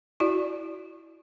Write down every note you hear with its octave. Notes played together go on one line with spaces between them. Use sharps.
E4 F#4 D5